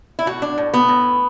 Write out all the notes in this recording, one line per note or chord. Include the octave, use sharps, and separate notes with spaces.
E4
A2 F#4
D4
A2
B3
A2